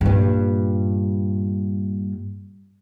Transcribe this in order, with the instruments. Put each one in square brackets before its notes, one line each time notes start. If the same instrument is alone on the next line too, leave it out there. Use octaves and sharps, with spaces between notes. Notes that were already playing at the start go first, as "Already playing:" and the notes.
[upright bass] G2 A#2